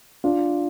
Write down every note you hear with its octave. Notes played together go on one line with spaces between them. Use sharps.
D4 F4